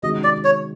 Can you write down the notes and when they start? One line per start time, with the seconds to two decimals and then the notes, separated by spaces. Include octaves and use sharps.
0.03 C3 D#3 G#3 C#4 F#4 D#5
0.24 D5
0.44 C#5